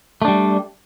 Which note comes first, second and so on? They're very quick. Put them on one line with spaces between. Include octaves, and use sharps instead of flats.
A3 D4 G3